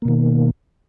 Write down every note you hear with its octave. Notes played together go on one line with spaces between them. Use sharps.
B2 D#3 A#3